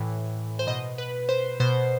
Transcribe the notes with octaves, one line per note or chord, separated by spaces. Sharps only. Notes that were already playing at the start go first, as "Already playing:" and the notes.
Already playing: A2 E3
C5
B2 D#5
B4
C5
B2 C5